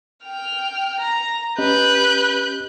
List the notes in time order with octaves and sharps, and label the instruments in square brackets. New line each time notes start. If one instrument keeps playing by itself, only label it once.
[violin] G5 F6
A#5
[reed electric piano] C#4 G4 D#5 [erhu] B4 [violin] F#6 G6